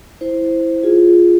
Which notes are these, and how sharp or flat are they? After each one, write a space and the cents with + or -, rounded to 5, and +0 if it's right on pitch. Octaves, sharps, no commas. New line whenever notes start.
E4 +0 C5 +0
F4 +0 G#4 +0